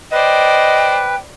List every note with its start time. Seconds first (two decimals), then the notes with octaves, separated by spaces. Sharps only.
0.12 B4 C5 D5 D#5 G5